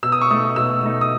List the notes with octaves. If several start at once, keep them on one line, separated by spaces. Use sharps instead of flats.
B2 E6
D#6
C#6
A3 D#4 D#6
B2 E6
A3 D#4
D#6